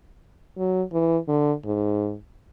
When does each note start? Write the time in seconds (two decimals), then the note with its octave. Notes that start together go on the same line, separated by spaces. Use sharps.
0.58 F#3
0.92 E3
1.28 D3
1.65 G#2